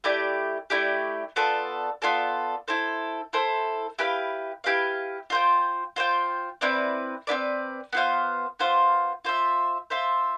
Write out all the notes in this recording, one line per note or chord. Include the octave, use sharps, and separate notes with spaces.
A3 E4 G4 D5
A3 E4 G4 D5
B3 F4 A4 D5
B3 F4 A4 D5
E4 A4 C5
E4 A4 C5
E4 G4 B4 F5
E4 G4 B4 F5
F4 C5 G5
F4 C5 G5
C4 E4 B4 D5
C4 E4 B4 D5
B3 F4 C5 F5
B3 F4 C5 F5
F4 C5 E5
F4 C5 E5